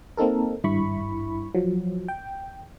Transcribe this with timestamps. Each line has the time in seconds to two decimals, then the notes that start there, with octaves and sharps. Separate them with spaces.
0.17 A#3 C4 D#4 A4 A#4
0.64 G#1 G2 E4 B5 C#6
1.55 F3 F#3
2.08 G5